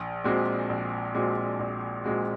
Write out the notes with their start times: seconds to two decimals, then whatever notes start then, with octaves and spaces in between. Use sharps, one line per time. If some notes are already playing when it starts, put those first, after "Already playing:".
Already playing: A#1
0.24 A#2 G#3 C4 F#4
0.70 A#1
1.14 A#2 G#3 C4 F#4
1.59 A#1
2.04 A#2 G#3 C4 F#4